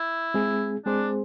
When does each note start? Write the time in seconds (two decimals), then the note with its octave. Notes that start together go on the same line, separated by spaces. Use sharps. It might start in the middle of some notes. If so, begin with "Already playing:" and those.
Already playing: E4
0.34 G#3 C4 G#4
0.86 G#3 C4 D4 G#4 C5